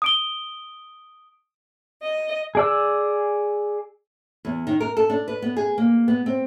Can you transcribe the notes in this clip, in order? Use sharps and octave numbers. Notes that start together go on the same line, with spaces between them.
D#6 D7 G7
D#5
G#4 D5 E6
E2
D#3
A#4
A4
D4
B4
B3
G#4
A#3
B3
C4